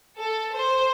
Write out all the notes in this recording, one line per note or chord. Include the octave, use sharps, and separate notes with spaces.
A4
C5